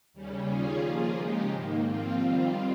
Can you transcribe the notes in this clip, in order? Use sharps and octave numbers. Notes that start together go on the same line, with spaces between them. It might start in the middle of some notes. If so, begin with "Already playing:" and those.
D#2 C#3 G3 C#4
D#3 G3 C#4 F4 G#4
F3 A#3 F4 G#4
C#3 G#3 D#4 G4
G#2 D#3 A#3
F3 C4 F4
D#3 G3 C4 F4